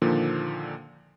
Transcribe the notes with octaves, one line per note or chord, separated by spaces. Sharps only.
A#2 D3 D#3 F3 A#3